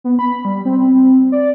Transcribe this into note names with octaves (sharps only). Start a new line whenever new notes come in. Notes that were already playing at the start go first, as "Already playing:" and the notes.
B3
B5
G3
C4
C4
D5